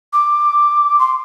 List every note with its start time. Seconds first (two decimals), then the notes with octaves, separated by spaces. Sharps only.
0.13 D6
0.99 C6